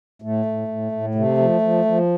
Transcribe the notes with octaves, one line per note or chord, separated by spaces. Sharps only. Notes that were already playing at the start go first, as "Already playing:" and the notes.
A2 A3
A2
A2
A2
C3 A3
F3
F3
F3